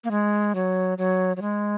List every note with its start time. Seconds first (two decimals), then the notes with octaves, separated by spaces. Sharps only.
0.04 A#3
0.11 G#3
0.55 F#3
0.98 F#3
1.37 F#3
1.42 G#3